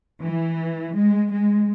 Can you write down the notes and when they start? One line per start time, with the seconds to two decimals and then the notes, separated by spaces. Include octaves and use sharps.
0.22 E3
0.94 G#3
1.31 G#3